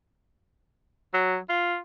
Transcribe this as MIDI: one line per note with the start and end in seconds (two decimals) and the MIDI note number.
1.13 1.37 54
1.49 1.78 65